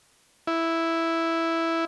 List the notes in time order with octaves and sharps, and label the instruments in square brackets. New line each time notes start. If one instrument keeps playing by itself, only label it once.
[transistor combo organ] E4